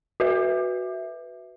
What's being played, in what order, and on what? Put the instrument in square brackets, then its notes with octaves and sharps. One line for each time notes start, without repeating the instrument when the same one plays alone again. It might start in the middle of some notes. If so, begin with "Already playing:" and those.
[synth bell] F#4 B4 E5